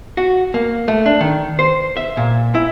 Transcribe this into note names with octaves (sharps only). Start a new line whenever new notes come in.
F#4
A#3
A3
D4
D#3
C5
E5
A#2
E4